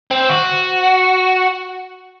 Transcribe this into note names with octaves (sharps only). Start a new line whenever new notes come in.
C4
F#4